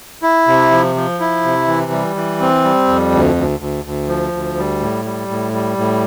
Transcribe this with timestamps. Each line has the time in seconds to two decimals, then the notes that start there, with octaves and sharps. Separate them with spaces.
0.23 E4
0.47 C3
0.71 F3
0.96 F3
1.20 E4
1.44 C3
1.68 E3
1.92 G3
2.16 E3
2.41 C4
2.64 G3
2.88 F2
3.13 D2
3.36 D2
3.60 D2
3.85 D2
4.08 F3
4.32 D2
4.57 G3
4.80 A2
5.05 G3
5.28 A2
5.53 G3
5.77 A2